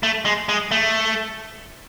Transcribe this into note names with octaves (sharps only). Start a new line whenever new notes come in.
A3
G#3
G#3
A3